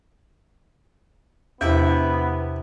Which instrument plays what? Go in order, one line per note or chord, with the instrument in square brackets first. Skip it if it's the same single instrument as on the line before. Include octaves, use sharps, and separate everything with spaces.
[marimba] E2 [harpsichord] C3 E4 E5 [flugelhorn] B3